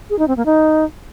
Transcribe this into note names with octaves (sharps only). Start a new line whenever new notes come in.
G#4
D#4
C4
A#3
D#4